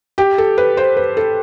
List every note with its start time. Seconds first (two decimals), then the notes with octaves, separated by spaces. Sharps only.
0.18 G4
0.38 A4
0.58 B4
0.77 C5
0.97 B4
1.17 A4